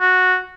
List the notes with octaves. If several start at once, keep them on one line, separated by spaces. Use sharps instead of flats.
F#4